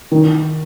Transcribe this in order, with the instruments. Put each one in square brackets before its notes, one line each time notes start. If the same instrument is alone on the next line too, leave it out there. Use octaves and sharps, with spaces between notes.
[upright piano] D#3